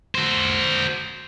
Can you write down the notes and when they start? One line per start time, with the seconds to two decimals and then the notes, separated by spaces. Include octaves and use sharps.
0.15 F#4 C5